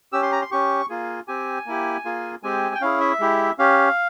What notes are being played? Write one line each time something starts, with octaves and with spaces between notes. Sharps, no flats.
C#4 G4 E6
C6
A#5
C6
C#4 G4 C#6
A#3 F4 G#4
C4 G4 G#5
A#3 E4 G4
A#3 F4 G#4
G#3 C4 G4 G#5
G5
C#4 E4 G#4 F5
E5
G#3 E4 G4
C#4 G4 F5